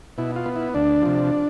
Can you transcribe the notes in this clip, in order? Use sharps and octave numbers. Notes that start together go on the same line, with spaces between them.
B2 E4
F4
B3
E4
D2 D4
C3 F3